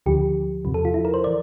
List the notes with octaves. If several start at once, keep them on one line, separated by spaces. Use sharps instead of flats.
D2 D3 F3 G4
E2 C3 F3
A4
F4
E4
A#4
C5
E3 D5